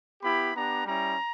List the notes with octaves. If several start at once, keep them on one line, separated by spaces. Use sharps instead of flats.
B3 E4 G4 B5
B3 D4 G4 A#5
G3 C#4 E4 A#5